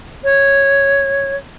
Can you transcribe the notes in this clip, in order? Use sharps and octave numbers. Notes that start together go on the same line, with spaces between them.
C#5